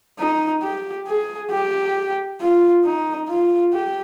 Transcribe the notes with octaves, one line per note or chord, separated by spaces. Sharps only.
D#4
G4
G#4
G4
F4
D#4
F4
G4